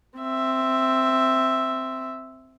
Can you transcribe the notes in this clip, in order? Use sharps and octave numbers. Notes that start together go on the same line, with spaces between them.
C4 E5